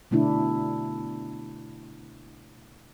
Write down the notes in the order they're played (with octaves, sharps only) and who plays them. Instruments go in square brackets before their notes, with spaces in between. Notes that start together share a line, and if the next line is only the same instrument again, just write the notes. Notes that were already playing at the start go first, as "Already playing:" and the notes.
[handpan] B2 D3 A3 D4 E4